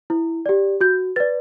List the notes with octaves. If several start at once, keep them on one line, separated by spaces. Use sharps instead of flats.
E4
G4 D5
F#4 G6
B4 D5 A6